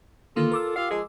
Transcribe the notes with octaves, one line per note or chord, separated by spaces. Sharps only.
D3 D#3 A#3 F4 A4
A#4 D6 E6
F4 G4 F5
F3 G#3 G#4